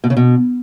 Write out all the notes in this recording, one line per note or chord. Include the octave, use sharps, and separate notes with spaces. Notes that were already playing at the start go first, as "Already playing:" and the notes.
B2
C#3
B2